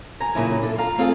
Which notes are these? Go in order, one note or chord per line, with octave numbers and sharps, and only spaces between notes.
F#2 G#5 A#5
D#2 A#2 C#3 F#3 E4 G#5
D4 A4
F4 F5 A#5
A3 C4 F4 G#4 A4 F5